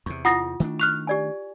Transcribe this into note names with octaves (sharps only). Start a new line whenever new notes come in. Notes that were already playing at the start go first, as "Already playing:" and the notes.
E2 C3 C#6
E4 F4 F#5 D#6 A#6
D#3 A3 D4
C#6 F6 F#6 F7
G4 D5 G#5